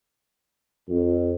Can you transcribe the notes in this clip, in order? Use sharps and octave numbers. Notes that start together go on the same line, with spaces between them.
F2